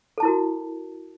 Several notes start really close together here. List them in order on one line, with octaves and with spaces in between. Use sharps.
A4 A5 E4 A#4 F#4